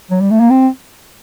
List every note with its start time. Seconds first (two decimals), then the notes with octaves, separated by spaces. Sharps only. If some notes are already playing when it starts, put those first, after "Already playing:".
0.11 F#3
0.21 G3
0.31 A3
0.40 A#3
0.50 C4